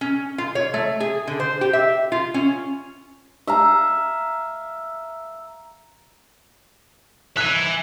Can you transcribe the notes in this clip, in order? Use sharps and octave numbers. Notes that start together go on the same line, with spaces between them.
C#4
F4
C#5
A3
G#4
D3
C5
G4
E5
F4
C#4
E5 F5 A#5
E5 G#5 F#6